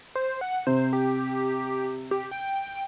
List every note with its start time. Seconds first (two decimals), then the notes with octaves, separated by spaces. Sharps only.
0.15 C5
0.41 F#5
0.67 C3 C5
0.93 G4
2.11 G4
2.31 G5